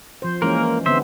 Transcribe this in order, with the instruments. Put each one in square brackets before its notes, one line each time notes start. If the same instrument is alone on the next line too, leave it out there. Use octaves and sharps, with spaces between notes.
[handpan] F3 C5
[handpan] E3 G#3 C#4 [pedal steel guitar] A#3 A#4
[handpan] D3 B3 C4 [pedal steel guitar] C5 E5